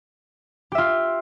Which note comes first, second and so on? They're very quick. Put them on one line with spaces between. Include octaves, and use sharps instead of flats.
G4 E5 F4